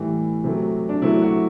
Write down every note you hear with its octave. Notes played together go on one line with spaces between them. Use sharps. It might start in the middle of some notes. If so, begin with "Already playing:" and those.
Already playing: A2 E3 G3
C3 F#3 A3
D4
C3 F#3 A3 E4
F#4